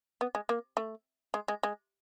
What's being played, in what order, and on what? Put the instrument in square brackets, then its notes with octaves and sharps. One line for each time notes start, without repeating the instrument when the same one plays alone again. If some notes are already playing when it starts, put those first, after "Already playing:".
[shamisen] B3
G#3
A#3
A3
G#3
G#3
G#3